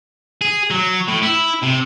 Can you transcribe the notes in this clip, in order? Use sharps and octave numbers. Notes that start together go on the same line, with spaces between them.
G#4
F#3
A2
E4
C3